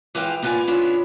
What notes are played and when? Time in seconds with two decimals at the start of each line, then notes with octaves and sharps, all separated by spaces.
0.15 E3 G#3 B4 C5 F5 G5
0.42 A#3 B3 F4 B4 D5 G#5
0.67 B3 C#4 D4 E4 F4